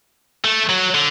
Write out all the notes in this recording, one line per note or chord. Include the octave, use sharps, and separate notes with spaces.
A3
F#3
D3